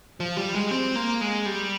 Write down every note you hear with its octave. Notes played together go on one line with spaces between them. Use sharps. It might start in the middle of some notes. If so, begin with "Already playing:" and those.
F3
G3
G#3
C4
A#3
G#3
G3